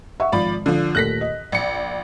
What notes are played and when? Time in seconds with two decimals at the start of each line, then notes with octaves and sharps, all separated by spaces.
0.20 E5 F#5 C#6
0.32 G#1 F3 D5 B5
0.66 D3 F3
0.95 D#2 A#2 A3 F#6 A#6 B6
1.21 D#5
1.52 A#1 C#7